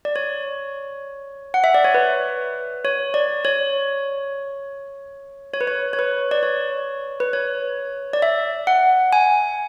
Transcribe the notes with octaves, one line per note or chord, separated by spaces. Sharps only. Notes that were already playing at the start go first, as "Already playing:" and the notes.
D5
C#5
F#5
E5
D5
C#5
B4
C#5
D5
C#5
C#5
B4
C#5
C#5
B4
D5
C#5
B4
C#5
D5
E5
F#5
G#5